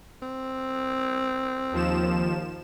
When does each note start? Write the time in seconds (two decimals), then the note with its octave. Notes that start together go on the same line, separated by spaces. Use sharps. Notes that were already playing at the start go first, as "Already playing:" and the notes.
0.22 C4
1.72 D#2 F3 E7